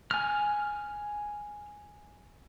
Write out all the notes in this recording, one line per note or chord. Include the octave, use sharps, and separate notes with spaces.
G#5 F6